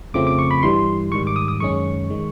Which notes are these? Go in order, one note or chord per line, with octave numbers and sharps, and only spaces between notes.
F2 C#3 F3 A3 C4 D6
D6
C#6
B5
G2 E3 G3 C6
G#2 D#3 G3 C#6
D6
D#6
D#6
F#2 D#3 G#3 C#4 C#6
D#3 G#3